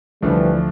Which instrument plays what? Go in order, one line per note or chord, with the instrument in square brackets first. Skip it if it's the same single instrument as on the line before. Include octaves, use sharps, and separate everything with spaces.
[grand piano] D2 D3 F3 A3 [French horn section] E3 G3